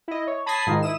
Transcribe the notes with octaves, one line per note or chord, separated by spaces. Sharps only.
E4 D#5
C#5
A5 B5 D#6 G#6 A#6 C7
G#2 D#3 D#4 F4
E4 D#6 E7